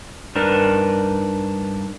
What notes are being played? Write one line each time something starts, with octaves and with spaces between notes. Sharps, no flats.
G2 D4 D#4 A#4 B4